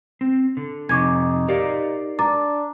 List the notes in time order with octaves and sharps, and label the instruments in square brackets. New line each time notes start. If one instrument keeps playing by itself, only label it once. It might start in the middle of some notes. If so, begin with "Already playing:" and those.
[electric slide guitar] C4
D3
[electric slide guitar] F2 C3 G#5 [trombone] D#4 [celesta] C#6 D6 G#6
[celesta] G4 [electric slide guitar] A#4 D5 F5
[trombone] D4 [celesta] A#5 D6 A6